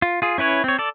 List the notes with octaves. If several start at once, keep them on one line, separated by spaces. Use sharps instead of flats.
F4
F4 G#4
C#4 E4 B4 C#5
C4 C#5
A4 D5